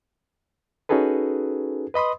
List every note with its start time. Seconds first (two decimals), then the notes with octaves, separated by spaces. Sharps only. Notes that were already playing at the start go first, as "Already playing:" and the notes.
0.89 C#4 D#4 F#4 G#4 A4 B4
1.94 B4 D#5 B5 C6 D#6